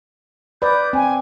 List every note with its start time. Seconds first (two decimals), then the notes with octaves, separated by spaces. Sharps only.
0.62 B4 D5 D#6 G6
0.93 C4 G#5